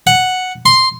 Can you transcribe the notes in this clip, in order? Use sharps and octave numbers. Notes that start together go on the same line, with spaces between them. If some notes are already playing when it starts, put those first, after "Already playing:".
F#5
C6